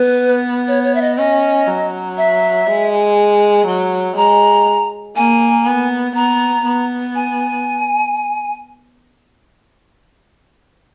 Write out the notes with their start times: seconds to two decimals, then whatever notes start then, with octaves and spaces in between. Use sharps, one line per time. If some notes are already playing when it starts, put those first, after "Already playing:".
Already playing: B3 B4
0.68 C#5
0.84 C#5
0.95 E5
1.01 D#5
1.17 C#4 D#5
1.67 F#3
2.17 E5
2.67 G#3
3.67 F#3
4.16 G#3 A#5
5.16 A#3 G#5
5.66 B3
6.15 B3 A#5
6.65 B3
7.15 G#5